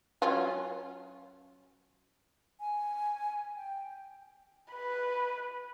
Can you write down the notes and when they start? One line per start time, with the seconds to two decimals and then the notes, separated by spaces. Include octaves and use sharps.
0.22 F#3 C#4 F4
2.60 G#5
3.56 G5
4.72 B4